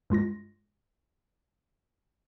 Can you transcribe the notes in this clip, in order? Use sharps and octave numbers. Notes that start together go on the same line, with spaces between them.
G2 G#3 F4 A#6